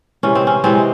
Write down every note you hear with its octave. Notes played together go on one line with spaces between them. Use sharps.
C3 E3 G#3 C#4
C4
C#4
C3 E3 G#3 C4